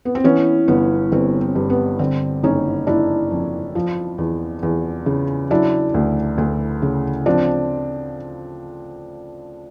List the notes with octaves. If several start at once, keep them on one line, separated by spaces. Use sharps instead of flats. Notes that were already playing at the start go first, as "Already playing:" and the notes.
B3
C4
E3 B3 C#4
G1 B3
G1 C4
C4
G2
B3
D3 C4
F#1 C#4 D#4
F#1 D4 E4
F2
F3
E2
E2
C#3
F#3 D4 E4
D2
D2
C#3
F3 C4 D4